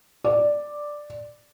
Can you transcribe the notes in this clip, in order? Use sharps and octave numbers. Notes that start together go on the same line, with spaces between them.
D5